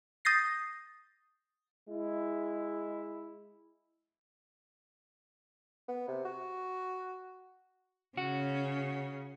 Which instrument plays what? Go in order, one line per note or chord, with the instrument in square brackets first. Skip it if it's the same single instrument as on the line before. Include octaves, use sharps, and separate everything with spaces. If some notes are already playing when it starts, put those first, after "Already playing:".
[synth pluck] D#6 G6 A6 A#6 C7
[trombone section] G#3 E4
[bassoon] B3
C3
F#4
[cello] C#3 C#4 [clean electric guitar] F#4